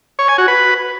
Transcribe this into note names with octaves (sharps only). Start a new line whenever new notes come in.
C#5
G#5
F#4
B4